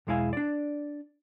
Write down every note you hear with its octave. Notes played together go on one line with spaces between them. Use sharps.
B1 E2 G#3 E4 F5 G#5
D4 D5